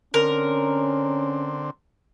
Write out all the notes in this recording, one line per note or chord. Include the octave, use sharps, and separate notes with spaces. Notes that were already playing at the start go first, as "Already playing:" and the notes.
D3 C4 C#4 A#4